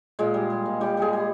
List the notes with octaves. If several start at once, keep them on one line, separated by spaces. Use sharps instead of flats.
A#2 G#3 G#4
G3
G3
A#2
A#2 G3 G4
G3 G#3 G#4
G3